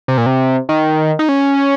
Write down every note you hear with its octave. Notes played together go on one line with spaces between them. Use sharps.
C3
A#2
C3
D#3
D#4
C#4